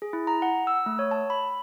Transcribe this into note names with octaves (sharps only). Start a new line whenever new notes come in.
G#4
E4
A#5
F#5
E6
A3
C#5
A5
B5